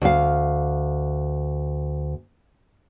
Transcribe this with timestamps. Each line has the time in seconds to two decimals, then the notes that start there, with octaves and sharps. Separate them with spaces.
0.02 D2 F5